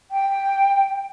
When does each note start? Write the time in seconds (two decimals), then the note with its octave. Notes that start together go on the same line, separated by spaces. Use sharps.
0.11 G5